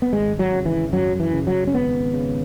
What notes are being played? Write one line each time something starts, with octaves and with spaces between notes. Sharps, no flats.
B3
G#1 G#3
F#3
C#3
E3
F#2 F#3
E3
C#3
F#3
C#4
G#1 B3
C#3